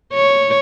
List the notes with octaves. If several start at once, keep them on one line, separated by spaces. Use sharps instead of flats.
C#5